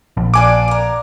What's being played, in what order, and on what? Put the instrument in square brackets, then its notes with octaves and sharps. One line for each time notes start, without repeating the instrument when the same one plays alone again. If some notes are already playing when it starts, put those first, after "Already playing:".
[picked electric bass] A#1
[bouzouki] D4 F4 B4 [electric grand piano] G#5 D6
[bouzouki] A#4 F5